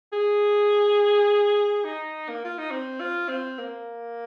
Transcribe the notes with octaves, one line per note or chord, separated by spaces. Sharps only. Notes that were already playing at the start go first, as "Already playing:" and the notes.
G#4
D#4
A#3
F4
D#4
C4
F4
C4
A#3